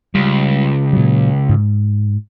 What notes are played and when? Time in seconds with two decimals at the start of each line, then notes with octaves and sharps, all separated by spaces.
0.15 C#2 G3
0.93 A#2 F#3
1.49 G#2